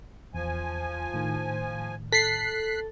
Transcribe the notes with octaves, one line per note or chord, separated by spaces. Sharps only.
E2 F3 G#5
A2 D#3
A4 F#6 B6 C7